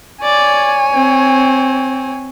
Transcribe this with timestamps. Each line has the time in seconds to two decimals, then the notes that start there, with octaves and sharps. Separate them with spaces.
0.22 C#5 D5 G#5
0.93 C4